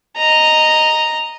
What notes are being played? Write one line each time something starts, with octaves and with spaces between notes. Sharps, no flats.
D#5 A#5